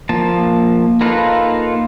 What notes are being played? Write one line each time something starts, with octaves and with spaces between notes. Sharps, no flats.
F3 A#3 A5
A#3 D#4 F4 A4 B4